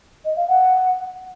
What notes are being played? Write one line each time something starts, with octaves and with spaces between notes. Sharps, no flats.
D#5
F5
F#5